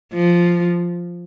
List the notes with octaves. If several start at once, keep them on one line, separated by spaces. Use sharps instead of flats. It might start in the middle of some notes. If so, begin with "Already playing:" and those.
F3